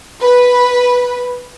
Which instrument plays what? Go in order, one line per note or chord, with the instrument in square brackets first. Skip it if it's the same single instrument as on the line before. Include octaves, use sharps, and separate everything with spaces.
[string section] B4